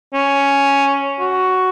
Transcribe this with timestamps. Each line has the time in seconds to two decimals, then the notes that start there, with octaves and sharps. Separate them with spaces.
0.14 C#4
1.20 F#4